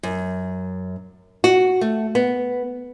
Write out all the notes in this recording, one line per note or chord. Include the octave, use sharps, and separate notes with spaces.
F#2
F#4
A3
B3